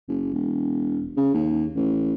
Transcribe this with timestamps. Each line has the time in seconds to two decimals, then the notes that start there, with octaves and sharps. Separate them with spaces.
0.08 F#1
0.33 E1
1.17 C#3
1.34 D#2
1.75 A1